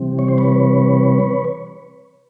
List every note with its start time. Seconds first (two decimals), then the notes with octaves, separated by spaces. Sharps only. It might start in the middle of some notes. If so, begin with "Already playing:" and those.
Already playing: C3 E3 G3 C4
0.19 C#5
0.28 C5
0.38 B4 C#5